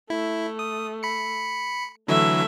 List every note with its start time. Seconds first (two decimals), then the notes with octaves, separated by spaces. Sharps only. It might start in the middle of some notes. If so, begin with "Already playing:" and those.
0.10 A3 E4
0.59 D#6
1.03 B5 C#7
2.08 D3 E3 F#3 A3 E5